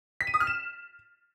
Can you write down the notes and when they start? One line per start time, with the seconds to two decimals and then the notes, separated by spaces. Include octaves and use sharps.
0.21 B6
0.27 D#7
0.34 D#6
0.40 F6
0.47 E7